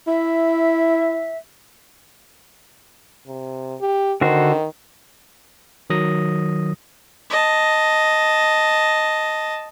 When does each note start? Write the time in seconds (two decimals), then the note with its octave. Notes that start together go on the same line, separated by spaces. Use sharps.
0.07 E4 E5
3.27 C3
3.81 G4
4.21 D3 D#3 F#4 C5
5.90 D#3 F#3 D#6 A#6
7.30 D#5 A5